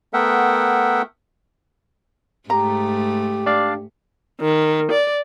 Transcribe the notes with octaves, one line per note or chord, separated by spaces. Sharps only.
A3 B3 A#4 E5 F#5 G5
G#2 A3 G4 A#5
D4 D5 F5
D#3
D5